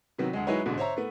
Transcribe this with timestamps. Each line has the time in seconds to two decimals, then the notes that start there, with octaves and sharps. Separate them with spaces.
0.18 C3 D#3 F#3 B3
0.33 D2 G#3
0.47 F#3 G#3 D#4 E4 B4 C#5
0.65 A1 G#2 B2 D3
0.77 C5 C#5 E5 A#5
0.96 A3 B3